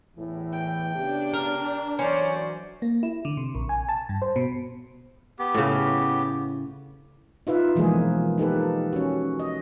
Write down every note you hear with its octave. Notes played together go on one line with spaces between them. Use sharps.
E2 A2 E3
G5
C#3 B3 D4 G4
A#4
E3 F#3 C#4 C5 D5
A#3
E4
D3
C3
A#1
G#5
A5
G2
C5
B2
B3 G4
A2 C#3
D#4 F4 B4 E5
B2 E3 F3 G#3 A#3 G#4
A#3 D#4 G4 A4 B4
C#4 F#4
D#5